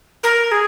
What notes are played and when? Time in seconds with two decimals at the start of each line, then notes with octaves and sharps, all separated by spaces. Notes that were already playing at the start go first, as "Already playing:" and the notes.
0.23 A#4
0.51 G#4